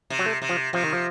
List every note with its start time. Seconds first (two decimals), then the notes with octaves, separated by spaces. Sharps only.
0.10 C3
0.19 F#3
0.26 A3
0.42 C3
0.49 F3
0.73 C3 F3
0.83 D#3
0.93 F3